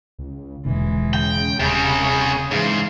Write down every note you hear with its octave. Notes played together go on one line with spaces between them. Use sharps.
C#2
D#1 E2 B2 D3 E3 G#3
C#3 G5
D#1 C3 G3 G#4
G#2 E3 F5